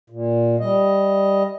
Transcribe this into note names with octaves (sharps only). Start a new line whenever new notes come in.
A#2
G3 D#5